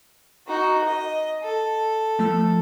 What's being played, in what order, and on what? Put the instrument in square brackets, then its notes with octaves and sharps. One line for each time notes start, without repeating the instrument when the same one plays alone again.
[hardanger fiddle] D#4 F#4
D#5
A4
[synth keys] F3 A3 E6